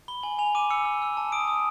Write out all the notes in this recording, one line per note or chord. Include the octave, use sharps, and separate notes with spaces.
B5 G7
G#5 F#7
G#5 F7
D6 D#7
E6 C#7
E6
E6
A5
D#6 D7
D#6